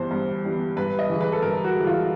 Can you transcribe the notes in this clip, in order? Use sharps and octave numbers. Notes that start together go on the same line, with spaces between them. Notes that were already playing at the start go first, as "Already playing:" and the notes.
Already playing: G2 E3 G3 B3 C5
G2
E3 G3 B3
G2 B4
D#5
E3 G#3
B4
A4
G2 A#4
F#4
E3 G#3
F4